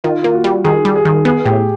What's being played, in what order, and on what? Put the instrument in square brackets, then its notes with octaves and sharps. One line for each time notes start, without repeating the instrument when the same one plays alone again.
[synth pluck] D#3 [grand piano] F4
[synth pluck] A#3 [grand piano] F4
[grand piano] F#4
[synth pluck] G3
[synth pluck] D#3 [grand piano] G#4
[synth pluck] G3
[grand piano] G#4
[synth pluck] D#3
[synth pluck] B3 [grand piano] G#4
[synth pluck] A2 [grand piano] G4